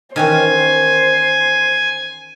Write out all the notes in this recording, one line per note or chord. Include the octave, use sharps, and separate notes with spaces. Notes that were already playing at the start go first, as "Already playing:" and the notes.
D#3 E3 C#4 C5 G#5